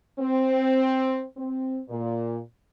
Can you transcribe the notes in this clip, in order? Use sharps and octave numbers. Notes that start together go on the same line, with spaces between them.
C4
C4
A#2